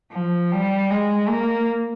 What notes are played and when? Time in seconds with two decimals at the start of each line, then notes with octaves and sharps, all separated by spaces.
0.12 F3
0.52 G3
0.91 G#3
1.29 A#3